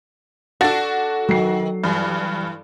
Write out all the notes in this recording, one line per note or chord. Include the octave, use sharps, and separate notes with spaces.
D4 F#4 A4 A5 A6
D#3 F#3 C7
G2 E3